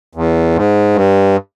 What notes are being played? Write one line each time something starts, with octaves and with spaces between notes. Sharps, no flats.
E2
G#2
G2